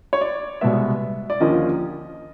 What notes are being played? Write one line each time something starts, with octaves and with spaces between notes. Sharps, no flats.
C#5
D5
C2 B2 G#3 B3 E5
D5
D#2 D3 F3 A#3 C#4 D#5